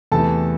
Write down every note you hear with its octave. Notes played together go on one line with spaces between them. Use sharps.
E2 C3 E3 A3 A4 A5